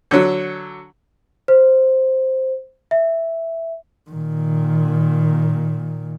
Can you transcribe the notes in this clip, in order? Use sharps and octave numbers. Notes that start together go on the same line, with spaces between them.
D3 F#3
C5
E5
A#2 D#3